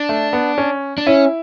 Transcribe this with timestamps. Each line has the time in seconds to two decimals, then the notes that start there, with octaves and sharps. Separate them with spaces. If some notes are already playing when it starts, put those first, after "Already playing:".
Already playing: D4
0.09 A3
0.33 B3
0.58 C#4
0.98 D4
1.07 C#4 E4